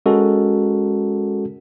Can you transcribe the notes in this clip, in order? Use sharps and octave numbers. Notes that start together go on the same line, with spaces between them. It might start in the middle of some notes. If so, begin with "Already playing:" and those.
G#3 C#4 F#4 A4 A#4